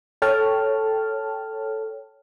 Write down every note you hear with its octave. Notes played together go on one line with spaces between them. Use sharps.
A4 C#5 G5 A5 F6